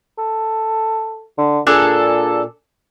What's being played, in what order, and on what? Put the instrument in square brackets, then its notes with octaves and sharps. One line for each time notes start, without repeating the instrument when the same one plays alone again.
[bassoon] A4
D3
[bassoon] A#2 [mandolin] D4 G#4 A4